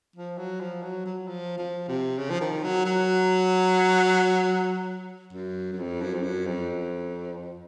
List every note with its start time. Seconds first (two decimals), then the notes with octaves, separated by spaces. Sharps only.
0.16 F3
0.38 F#3
0.61 F3
0.83 F#3
1.05 F#3
1.28 F3
1.58 F3
1.88 C3
2.18 C#3
2.30 F3
2.41 D#3
2.63 F#3
2.85 F#3
5.33 F#2
5.72 F#2
5.79 F2
6.01 F#2
6.14 F2
6.23 F#2
6.46 F2